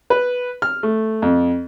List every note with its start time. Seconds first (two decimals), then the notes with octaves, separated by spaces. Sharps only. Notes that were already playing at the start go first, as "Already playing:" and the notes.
0.10 B4
0.62 F6
0.83 A3
1.22 F2